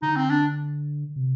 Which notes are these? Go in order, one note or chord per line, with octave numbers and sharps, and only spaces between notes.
D3 D#4
C4
D4
C3